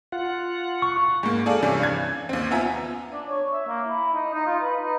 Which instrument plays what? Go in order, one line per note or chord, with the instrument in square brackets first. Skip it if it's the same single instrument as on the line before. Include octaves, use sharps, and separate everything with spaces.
[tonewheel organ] F4 F#5
[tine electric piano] C#6
[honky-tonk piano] G#2 A#3
G#4 A4 D5 F5
G2 C3 E3 C#4
G#6
D#2 C4
B3 F4 E5 G#5 A#5
[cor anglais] D4
C#5
E5
A#3
E4
D#4
D#4
F4
B4
D#4